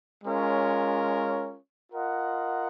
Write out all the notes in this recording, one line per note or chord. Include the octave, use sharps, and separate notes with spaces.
G#3 C#4 F4 A#4 C#5
F4 A#4 D#5 F#5